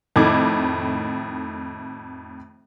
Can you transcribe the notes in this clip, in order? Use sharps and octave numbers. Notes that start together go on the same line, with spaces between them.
F2 A2 D#3 A3 D6 G#6